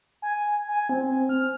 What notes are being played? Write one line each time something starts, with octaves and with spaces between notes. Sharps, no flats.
G#5
G#5
C4
F6